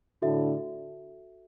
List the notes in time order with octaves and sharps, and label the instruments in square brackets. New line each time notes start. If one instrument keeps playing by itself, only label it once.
[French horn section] A2 D3 [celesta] F#4 A4 E5